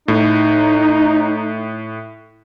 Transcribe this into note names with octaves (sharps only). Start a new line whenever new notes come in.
A2 D#4